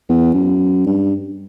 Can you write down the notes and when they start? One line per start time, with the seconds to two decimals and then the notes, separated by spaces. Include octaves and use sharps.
0.09 E2
0.34 F#2
0.86 G2